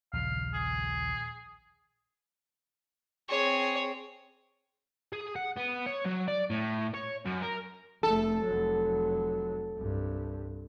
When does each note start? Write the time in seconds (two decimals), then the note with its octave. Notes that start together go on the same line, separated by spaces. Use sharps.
0.13 A#1 D#2 C#3 F5
0.54 G#4
3.29 C4 G#4 C#5
5.13 G#4
5.36 F#5
5.57 B3
5.87 C#5
6.05 F#3
6.28 D5
6.50 A2
6.94 C#5
7.26 F#2
7.43 A#4
8.03 F1 A3 A4
8.45 F1 F#3
9.76 C2 G2